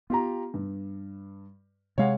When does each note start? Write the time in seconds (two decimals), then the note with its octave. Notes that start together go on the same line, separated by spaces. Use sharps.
0.10 B3 F4 G4 A#5
0.54 G2
1.98 C3 G#3 C#5 F5 F#5